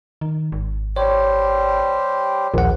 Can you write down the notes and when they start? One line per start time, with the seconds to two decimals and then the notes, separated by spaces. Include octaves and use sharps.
0.21 D#3
0.52 G#1
0.96 G3 G4 C5 C#5
2.54 A#1 D#2 F#5